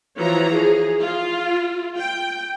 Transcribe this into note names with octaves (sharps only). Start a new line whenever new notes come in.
E3 F3 F#4 C#5 A#5
G#4
F4
G5